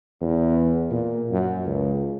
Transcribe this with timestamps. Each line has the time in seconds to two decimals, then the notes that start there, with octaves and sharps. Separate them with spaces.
0.21 E2
0.91 A#2
1.31 F#2
1.65 C#2